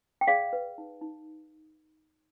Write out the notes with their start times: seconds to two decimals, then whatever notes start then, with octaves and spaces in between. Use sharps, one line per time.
0.21 G5
0.27 G#4 D5 F5
0.53 B4
0.78 D#4
1.01 D#4